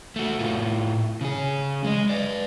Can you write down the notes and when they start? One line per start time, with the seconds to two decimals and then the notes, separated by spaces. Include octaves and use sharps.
0.16 A3 F#4
0.39 A2 F4
1.21 C#3 G#4
1.84 G#3 D#5
2.10 B4 D5